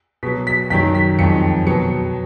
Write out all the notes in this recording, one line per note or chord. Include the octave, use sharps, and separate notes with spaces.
B2 F#3 B6
B6
F#2 D#3 F#3 B6
B6
F2 D#3 G#3 C#7
B2 F#3 C#7